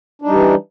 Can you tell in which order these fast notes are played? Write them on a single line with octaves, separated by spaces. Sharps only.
D4 D#4 G3 E3